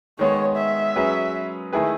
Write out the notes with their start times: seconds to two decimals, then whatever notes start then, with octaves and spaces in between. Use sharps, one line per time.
0.19 D#3 G#3 B3 C#5
0.57 E5
0.96 F#3 C#4 G#4 B4
1.73 D#3 A3 E4 G#4 B4